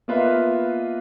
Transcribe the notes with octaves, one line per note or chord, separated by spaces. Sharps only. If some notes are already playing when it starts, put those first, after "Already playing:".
A#3 B3 F4 B4 D#5 E5